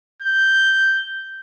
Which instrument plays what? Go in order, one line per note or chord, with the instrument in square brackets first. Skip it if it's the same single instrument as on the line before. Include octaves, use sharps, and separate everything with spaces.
[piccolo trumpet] G6